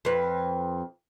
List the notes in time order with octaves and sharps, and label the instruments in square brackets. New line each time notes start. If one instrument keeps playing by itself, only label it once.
[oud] F2 B4